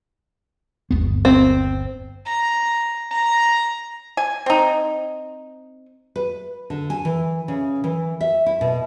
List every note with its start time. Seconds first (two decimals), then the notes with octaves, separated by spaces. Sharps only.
0.91 G1 D#2 B3
1.25 C4
2.26 A#5
3.11 A#5
4.17 G#5
4.46 C4 D#4
6.16 B4
6.70 D3
6.90 G#5
7.05 E3
7.48 C#3
7.84 E3
8.21 E5
8.46 E4
8.61 B2